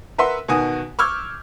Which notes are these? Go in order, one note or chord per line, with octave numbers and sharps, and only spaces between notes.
A#4 B4 E5 F#5 C6
B2 D#3 F#4 G#5 D#6
C#6 D6 E6 F6 G6 G#6